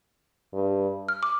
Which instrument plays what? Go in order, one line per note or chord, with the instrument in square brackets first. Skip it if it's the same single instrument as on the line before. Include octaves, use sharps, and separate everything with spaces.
[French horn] G2
[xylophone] F6
D6